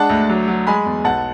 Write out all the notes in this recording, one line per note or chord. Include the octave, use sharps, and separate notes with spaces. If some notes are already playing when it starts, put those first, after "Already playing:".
Already playing: G#3 D4 F#5 A5
D2
F#3
F#3
G#3 G#5 B5
E2
B1 F#5 A5